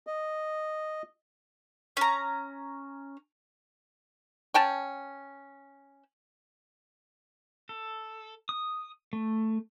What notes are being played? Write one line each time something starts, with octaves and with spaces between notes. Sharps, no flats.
D#5
C#4 A#5
C#4 G5 A5
A4
D#6
A3